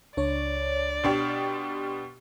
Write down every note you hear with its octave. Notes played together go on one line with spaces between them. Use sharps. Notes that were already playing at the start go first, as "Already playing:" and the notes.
C#2 D4 C#5 D5
B2 D4 G4 C6 F6